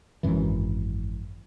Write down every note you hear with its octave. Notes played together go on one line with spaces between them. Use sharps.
G#1 F#2 E3